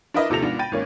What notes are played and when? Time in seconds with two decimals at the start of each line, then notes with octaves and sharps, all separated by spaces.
0.14 D4 E4 A#4 B4 D#5 E5
0.30 D#2 C3 F3 A4 A#6 F7
0.42 G#2 B3 D4 F4
0.59 G5 B5 A6 D#7
0.72 G#1 A#3 C#4